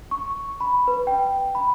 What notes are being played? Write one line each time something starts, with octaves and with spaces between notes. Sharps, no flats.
C#6
B5
B4
G5
B5